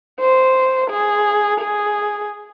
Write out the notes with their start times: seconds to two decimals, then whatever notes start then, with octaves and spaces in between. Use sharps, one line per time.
0.21 C5
0.91 G#4
1.61 G#4